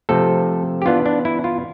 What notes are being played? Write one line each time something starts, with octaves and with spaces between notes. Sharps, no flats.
C3 F3 A3 C4 A4
G4
E3 B3 D4 F4
D4
E4
F4